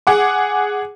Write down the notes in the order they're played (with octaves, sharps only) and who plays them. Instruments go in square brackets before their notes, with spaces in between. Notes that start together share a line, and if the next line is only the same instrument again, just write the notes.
[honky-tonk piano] G#4 F#5 D6